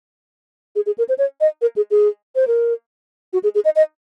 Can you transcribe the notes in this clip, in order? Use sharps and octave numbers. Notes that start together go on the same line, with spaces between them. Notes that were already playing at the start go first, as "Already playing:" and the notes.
G#4
G#4
A#4
C5
C#5
D#5
A#4
G#4
G#4
C5
A#4
F#4
G#4
G#4
D#5
D#5